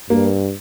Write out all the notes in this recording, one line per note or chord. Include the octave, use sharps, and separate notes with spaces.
G2 A#3